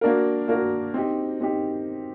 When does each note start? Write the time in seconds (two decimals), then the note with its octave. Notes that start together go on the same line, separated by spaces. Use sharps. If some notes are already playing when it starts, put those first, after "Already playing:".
0.01 A#3 D4 F#4 A#4
0.48 A#3 D4 F#4 A#4
0.94 C4 D#4 G4
1.41 C4 D#4 G4